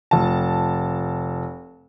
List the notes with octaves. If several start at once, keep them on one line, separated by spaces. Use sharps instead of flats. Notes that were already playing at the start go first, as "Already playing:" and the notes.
F1 A5